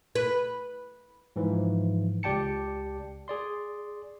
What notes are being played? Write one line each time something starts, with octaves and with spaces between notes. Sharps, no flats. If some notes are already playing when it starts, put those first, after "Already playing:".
B4
G#2 E3 F3
C#2 G4 D5 G5 A5 C#7
G#4 D5 C6